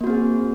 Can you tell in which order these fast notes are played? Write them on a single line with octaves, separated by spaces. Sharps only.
A#3 F#4 C4 G#4